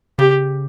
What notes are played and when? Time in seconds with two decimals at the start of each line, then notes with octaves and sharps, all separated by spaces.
0.19 C#3 G4